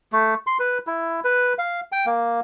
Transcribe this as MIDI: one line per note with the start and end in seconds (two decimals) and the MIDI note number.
0.12 0.34 57
0.47 0.58 84
0.59 0.78 71
0.87 1.20 64
1.24 1.53 71
1.59 1.81 77
1.92 2.06 79
2.06 2.40 58